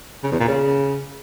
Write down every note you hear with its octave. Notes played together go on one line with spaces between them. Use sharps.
C#3
E2
A#2
C#3